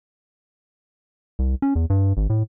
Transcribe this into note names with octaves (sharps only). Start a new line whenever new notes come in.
C2
C#4
E2
G2
G#1
A2